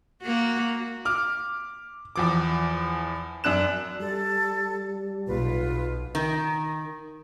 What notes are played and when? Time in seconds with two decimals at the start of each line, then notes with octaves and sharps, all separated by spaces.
0.22 A#3 F#4
1.05 D6 F6
2.16 E2 F3 D6
3.44 F#2 D4 F#6 E7
4.00 G3 A4
5.27 B1 B2 F4 B4
6.15 D#3